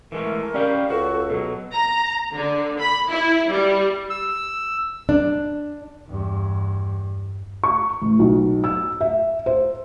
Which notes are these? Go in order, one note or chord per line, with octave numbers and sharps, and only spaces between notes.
E3 G#3 A3 A#4
G3 C#4 F5 G5
C#2 F#4 A4
B2 F#3
A#5
D3
B5
E4
G3
E6
D4
E2 G2
C#6
A1
B1
E6
E5
C5